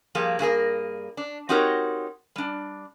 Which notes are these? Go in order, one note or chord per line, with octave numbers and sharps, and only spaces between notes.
F3 G3 A#3 G#4
G2 A#3 G#4 A#4
D4
C4 D#4 F#4 G4 A#4 C#5
G3 D4